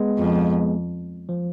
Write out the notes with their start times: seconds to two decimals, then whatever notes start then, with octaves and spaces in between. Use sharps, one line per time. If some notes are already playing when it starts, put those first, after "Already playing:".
Already playing: G#3 B3
0.18 F2
1.29 F3